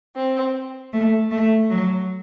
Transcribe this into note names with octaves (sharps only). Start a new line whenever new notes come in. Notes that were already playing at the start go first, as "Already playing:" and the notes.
C4
A3
A3
F#3